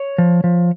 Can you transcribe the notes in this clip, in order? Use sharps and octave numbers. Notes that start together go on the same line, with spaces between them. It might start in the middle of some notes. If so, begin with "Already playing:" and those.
Already playing: C#5
F3
F3